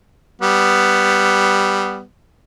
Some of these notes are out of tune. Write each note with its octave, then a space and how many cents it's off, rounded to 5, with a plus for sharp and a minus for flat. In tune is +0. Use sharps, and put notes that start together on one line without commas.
G3 +0 B3 +5